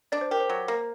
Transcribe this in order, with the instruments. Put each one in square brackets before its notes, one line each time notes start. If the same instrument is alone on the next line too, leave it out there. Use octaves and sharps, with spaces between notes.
[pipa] D4 [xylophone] D5
[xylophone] C5
[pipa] G4 [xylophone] A#4
[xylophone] C5
[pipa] F#3
A#3